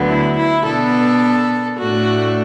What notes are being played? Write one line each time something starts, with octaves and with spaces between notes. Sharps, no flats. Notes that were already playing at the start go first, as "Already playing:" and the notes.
Already playing: D2 D3 F#3 B3
E4
E4
B2 B3 D4 A4
A2 A3 D4 F#4